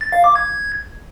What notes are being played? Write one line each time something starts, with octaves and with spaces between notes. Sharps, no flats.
A6
F5
D6
G#6